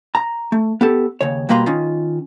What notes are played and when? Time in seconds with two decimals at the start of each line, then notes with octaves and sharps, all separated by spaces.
0.15 A#5
0.52 A3
0.81 B3 G4 A4
1.21 D#2 C#3 C#5
1.49 B2 G3 A#3 B4 A#5 C6
1.66 D#3 C#4 D#4 F4